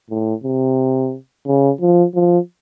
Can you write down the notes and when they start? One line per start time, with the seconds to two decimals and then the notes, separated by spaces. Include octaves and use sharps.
0.10 A2
0.44 C3
1.47 C#3
1.81 F3
2.15 F3